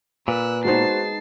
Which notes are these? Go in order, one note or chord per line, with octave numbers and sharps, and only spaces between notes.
A#2 B4 E6 F#6
G#3 B3 D#4 F#4 C5 A5 C7